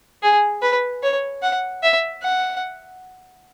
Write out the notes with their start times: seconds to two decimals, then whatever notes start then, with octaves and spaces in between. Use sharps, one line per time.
0.23 G#4
0.62 B4
1.03 C#5
1.42 F#5
1.83 E5
2.23 F#5